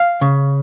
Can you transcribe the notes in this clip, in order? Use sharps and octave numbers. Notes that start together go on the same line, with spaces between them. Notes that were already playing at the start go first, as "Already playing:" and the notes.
Already playing: F5
C#3